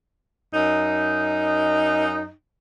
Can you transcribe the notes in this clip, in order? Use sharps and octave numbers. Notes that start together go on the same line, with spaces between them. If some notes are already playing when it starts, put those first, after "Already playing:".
F#2 D#4